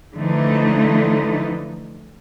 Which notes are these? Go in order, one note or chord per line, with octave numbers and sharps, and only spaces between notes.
D3 E3 F3 A3 D#4